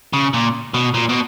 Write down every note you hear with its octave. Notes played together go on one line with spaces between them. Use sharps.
C#3
A#2
B2
A#2
B2